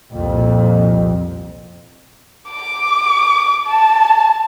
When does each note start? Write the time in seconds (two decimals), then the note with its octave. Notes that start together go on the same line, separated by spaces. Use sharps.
0.12 C2 F2 A#2
2.50 D6
3.66 A5